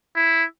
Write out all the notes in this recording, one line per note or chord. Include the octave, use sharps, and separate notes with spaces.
E4